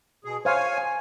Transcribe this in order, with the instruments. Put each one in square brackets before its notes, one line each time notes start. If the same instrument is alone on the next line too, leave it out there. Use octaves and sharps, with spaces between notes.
[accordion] B2 G#4
[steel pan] C5 F5 C#6 [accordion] C#5 G#5
[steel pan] G#5